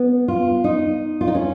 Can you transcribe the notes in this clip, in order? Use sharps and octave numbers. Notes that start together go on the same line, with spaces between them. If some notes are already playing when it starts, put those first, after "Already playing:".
Already playing: B3
F4
D#4
F4
D#4
C#4